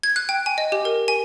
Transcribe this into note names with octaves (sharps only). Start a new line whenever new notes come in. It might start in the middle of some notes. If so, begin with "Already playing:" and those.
G#6
F#6
G5
G#5
D#5
G4
A#4
G#5